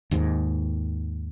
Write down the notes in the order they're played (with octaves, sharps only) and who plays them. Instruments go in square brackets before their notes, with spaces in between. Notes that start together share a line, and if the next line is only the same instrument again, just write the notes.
[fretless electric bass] D#2 G#2